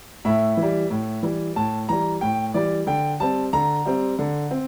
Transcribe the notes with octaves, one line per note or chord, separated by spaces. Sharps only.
A2 E5
E3
G3
A2
E3 G3
A2 A5
E3 G3 A#5
A2 G5
E3 G3 D5
D3 G5
G3 C4 A5
D3 A#5
G3 C4
D3
C4